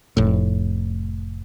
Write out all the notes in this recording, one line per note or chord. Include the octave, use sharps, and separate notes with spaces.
F1 A2